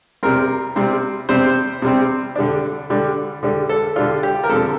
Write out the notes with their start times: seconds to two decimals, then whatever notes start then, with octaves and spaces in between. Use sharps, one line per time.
0.23 C3 G3 C4 A#4
0.76 C3 G3 C4
1.29 C3 G3 C4 C5
1.82 C3 G3 C4
2.36 D3 G3 D4
2.90 D3 G3 D4
3.43 D3 G3 D4
3.69 A4
3.96 D3 G3 D4 F4
4.23 G4
4.44 A#4
4.50 D3 F3 C4 A4